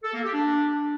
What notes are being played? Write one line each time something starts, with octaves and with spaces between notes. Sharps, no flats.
A4
A#3
G4
D4